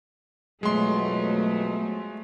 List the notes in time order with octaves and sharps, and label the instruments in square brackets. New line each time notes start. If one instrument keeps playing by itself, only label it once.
[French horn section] F2 B2 F#3 [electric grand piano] G#3 C6 [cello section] A3